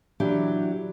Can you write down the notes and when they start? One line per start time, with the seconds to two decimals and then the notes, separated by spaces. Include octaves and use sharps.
0.20 E3 F#3 D4 G4